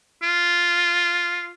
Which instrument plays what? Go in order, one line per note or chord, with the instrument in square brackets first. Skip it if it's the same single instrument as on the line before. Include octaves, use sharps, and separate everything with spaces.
[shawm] F4